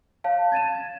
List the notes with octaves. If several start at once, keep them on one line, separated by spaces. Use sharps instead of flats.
C#5 F5 A5
G#6 A6 D#7 E7
G#6